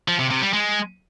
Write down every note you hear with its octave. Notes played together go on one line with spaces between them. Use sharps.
F3
C3
C3
G3
G#3